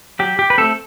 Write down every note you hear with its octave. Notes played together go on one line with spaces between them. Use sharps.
F#3 G4
G4
B4
A3 C4 A4